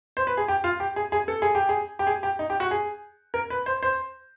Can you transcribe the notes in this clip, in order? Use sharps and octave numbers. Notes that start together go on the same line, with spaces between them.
C5
B4
G#4
G4
F4
G4
G#4
G#4
A4
G#4
G4
G#4
G4
G#4
G4
D#4
G4
F#4
G#4
A#4
B4
C5
C5